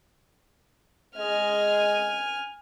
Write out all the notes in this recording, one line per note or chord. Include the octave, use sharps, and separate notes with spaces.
G#3 D#5 G#5 F6